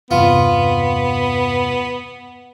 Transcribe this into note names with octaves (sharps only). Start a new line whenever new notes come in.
E2 G2 C3 B3 F4